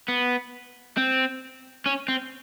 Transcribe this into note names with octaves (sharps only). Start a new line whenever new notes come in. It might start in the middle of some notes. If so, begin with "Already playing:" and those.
B3
C4
C#4
C4